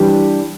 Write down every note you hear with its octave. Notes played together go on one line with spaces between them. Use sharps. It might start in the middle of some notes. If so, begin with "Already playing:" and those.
Already playing: E3 G3 D4 G4